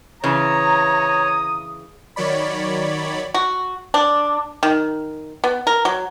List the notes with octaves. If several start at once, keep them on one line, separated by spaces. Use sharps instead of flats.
C#3 E3 C#5 A#5 D#6
D#3 F#3 C#5 D5 B5
F#4
D4
D#3
B3
A#4
F#3